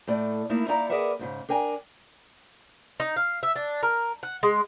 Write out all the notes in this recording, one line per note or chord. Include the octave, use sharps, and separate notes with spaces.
A2 A3 D5
A3 A#3 D#4 E4
D#4 E4 D5 F5 A#5
G#4 A#4 B4 D5 E5 F#5
D#2 G#2 C#3
D4 A#4 G5 G#5 A#5
D#4
F5
E5
D4
A#4
F#5
G#3